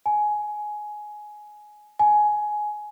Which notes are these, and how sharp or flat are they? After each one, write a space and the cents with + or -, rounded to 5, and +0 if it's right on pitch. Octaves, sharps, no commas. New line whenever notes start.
G#5 +15
G#5 +15